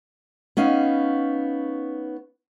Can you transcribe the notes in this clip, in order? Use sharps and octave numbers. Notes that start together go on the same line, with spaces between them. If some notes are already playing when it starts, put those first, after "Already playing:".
B3 C#4 D#4 F5